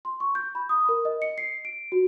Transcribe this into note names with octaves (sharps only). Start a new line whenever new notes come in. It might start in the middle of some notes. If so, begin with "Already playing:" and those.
C6
C#6
G6
B5
D#6
A#4
D#5
C#7
C7
D7
F#4